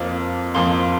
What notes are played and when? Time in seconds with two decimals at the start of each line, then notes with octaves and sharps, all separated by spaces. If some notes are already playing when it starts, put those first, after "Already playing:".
Already playing: F2 F3 A#3
0.54 F2 F3 A#3 C6